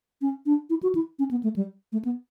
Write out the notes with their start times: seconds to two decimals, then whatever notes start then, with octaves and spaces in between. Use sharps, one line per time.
0.21 C#4
0.46 D4
0.70 E4
0.83 F#4
0.95 E4
1.19 C#4
1.31 B3
1.43 A3
1.56 G3
1.92 A3
2.05 B3